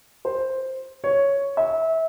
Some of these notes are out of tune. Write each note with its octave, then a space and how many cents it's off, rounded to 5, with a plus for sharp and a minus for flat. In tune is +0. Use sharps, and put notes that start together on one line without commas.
C5 +5
C#5 +5
E5 -25